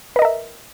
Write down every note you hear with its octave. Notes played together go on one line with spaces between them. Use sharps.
A#4 B4 D#5 E5